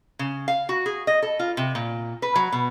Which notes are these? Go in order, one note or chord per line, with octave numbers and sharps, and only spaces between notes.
C#3
F5
F#4
G#4
D#5
A4
F4
C3
A#2
B4
F#3
B2